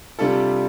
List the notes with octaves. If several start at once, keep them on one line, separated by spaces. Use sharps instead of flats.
C3 G3 D4 F4 A4